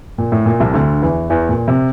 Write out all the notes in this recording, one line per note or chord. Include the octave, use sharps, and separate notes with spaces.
A#2
A2
A#2
C2 C3
D2 D3
E2 E3
E2 E3
A#2
C3